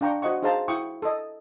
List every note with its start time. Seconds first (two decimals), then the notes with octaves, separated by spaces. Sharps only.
0.01 D4 F5 G5 A#5 C#6
0.22 F#4 C5 D#5 F#5 C#6
0.43 D#4 G#4 C5 F5 A5 A#5
0.68 E4 G5 C#6 D#6
1.02 A4 D#5